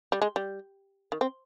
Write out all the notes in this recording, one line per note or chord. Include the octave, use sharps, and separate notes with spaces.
G3
G#3
G3
D#3
C4